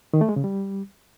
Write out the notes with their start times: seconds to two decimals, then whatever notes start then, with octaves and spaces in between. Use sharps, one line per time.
0.14 D#3
0.21 A3
0.29 G#3
0.36 C#3
0.44 G3